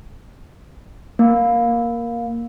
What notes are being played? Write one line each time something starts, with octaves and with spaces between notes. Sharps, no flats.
A#3